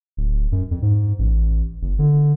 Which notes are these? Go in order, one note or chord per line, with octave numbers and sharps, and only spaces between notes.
D1
F#2
F2
G#2
A1
F#1
D3